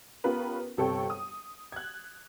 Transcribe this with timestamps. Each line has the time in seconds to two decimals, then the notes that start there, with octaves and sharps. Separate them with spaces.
0.24 B3 C#4 F4 G4 A#4 B4
0.77 G1 C3 A4 C#5 G5 C#6
1.10 D#6
1.72 F#6 G#6